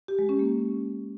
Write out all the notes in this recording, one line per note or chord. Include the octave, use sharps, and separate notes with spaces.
G4
G#3
C#4
A#3